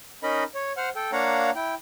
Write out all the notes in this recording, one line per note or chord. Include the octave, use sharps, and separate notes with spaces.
C#4 D#4 A#4 D#5 B5
C#5
C5 F#5 F6
A4 G5
A#3 D4 C#5 F5 F#5 A#5
E4 G5